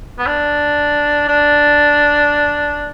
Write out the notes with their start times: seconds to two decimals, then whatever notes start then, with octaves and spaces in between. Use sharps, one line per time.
0.18 B3
0.26 D4
1.28 D4